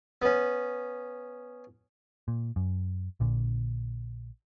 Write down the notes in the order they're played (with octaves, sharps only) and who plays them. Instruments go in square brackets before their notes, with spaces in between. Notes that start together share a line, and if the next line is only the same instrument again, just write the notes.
[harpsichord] B3 C#4
[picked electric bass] A#2
F#2
A#1 A#2 D3